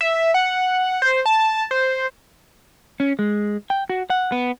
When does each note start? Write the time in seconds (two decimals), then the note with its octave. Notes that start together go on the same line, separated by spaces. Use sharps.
0.01 E5
0.34 F#5
1.02 C5
1.26 A5
1.71 C5
3.00 C#4
3.19 G#3
3.70 G5
3.90 F#4
4.10 F#5
4.32 B3